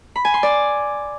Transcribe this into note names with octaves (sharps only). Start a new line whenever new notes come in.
B5
G#5
C6
D5